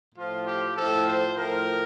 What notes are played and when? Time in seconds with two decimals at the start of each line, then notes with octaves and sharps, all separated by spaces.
0.15 A2 F3 F4
0.45 G4
0.75 A2 F3 A4
1.06 C5
1.36 A2 F3 A#4